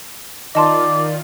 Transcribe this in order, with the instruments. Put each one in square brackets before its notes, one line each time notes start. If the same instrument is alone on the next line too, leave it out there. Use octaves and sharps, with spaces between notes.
[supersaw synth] D#3 F4 [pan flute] D5 [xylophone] D#5 A5 C6 [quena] D6